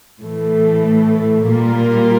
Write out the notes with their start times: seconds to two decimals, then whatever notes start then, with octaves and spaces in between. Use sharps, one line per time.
0.22 A2 E3 A3
1.48 A#2 G3 A#3 F4 A#4